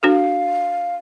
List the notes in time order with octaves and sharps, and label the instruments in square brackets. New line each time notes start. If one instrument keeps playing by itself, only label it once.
[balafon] D4 F#4 A4 [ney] F5